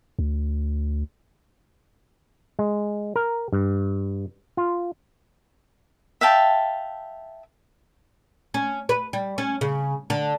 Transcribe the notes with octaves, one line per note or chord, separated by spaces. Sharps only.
D2
G#3
A#4
G2
F4
E5 F5 G5 A5
C#4
B4
G3
C#4
C#3
D3